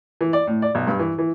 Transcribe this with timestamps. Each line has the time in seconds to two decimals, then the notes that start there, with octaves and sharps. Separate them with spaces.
0.21 E3
0.33 D5
0.47 A2
0.62 D5
0.75 B1
0.87 G2
0.99 E3
1.18 E3